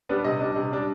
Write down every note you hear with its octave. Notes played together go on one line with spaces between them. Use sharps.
G3 B3 D4
C3 D#5
G3 D4
C3
G3 D4